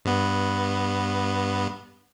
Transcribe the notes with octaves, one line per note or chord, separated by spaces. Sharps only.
G2 B3